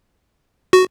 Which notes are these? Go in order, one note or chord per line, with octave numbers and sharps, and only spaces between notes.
F#4